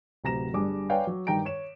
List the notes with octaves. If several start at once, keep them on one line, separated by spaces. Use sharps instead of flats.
D1 C3 A#5 A#6 E7
G1 G3 D4 G#4 D6
B4 C#5 D5 F5 G5 G#5
F#3
G2 D#3 G5 A#5 D7
C#5 E7